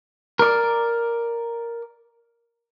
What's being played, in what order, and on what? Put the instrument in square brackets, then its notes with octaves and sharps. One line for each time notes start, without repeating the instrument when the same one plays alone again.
[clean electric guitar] A#4 D5